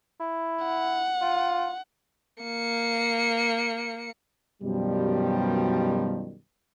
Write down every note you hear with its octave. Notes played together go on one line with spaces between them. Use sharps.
E4
F#5
F4
A#3 C#7
F#2 B2 D#3 F3 G3